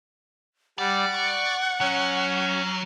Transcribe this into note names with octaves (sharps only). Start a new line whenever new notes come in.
G3 D5 F#5
C#6
F#3 C#4